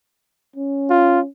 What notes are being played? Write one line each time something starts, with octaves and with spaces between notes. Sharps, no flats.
C#4
F4